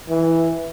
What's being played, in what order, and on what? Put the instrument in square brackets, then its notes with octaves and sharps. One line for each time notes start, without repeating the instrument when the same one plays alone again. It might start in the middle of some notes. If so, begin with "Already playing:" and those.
[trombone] E3